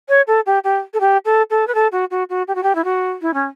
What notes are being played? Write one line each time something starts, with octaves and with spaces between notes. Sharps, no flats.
C#5
A4
G4
G4
A4
G4
A4
A4
B4
A4
F#4
F#4
F#4
G4
F#4
G4
E4
F#4
E4
C#4